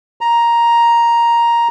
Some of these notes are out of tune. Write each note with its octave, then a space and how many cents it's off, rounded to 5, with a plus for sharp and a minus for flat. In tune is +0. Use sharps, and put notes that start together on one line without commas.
A#5 +5